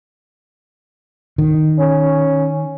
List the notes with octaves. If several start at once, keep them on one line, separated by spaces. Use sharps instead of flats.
D#3
C#4